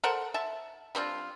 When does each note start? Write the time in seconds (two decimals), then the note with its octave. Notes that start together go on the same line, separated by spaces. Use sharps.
0.04 A4 A#4 C5 F#5
0.34 E5 A5
0.95 G3 C4 D4 F4